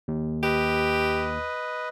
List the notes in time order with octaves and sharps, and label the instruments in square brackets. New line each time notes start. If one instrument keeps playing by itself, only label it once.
[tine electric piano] D#2
[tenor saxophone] G4 [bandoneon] B4 D#5